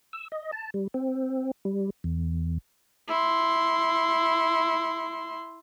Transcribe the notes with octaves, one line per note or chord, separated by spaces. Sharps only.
E6
D#5
A5
G3
C4
G3
E2
E4 C6